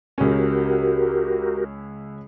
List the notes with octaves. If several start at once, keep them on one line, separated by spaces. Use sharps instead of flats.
C#2 C#4 F#4 G4 A#4